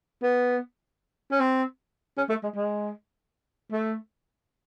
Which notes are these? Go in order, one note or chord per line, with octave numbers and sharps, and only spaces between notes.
B3
C#4
C4
C#4
A3
G#3
G#3
A3